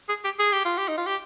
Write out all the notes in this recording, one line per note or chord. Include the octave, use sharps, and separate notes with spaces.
G#4
G4
G#4
G4
F4
G4
D#4
F4
G4